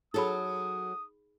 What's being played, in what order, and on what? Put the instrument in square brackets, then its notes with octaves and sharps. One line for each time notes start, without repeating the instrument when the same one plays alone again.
[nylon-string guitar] F#3 A4 [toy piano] D#4 G#4 B5 [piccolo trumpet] D#6